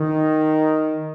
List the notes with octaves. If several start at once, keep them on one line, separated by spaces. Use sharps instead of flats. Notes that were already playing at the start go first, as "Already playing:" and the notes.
Already playing: D#3